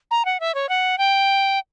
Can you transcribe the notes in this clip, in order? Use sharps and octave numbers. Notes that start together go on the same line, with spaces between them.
A#5
F#5
E5
C#5
F#5
G5